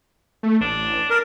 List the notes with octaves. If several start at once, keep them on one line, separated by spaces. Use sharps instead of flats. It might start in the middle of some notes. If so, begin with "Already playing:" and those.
A3
A1 D4
A#4